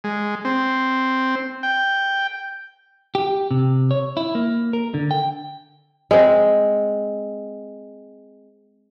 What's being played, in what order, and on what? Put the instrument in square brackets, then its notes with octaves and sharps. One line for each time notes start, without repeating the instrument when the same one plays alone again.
[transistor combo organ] G#3
C4
G5
[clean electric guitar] G4
C3
C#5
E4
A#3
A#4
D3
G5
[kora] G#3 C4